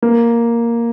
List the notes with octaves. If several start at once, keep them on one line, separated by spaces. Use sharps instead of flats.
A#3